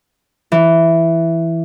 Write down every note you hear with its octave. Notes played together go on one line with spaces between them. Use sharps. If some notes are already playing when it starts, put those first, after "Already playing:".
E3